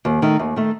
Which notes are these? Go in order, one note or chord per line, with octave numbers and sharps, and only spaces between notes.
D#2
D#3 A3
D#2
D#3 A3